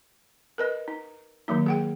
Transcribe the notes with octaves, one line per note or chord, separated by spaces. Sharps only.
A#4 B4 D#5
D#4
D#3 F#3 A#3 D#4
G#4 F#5 G5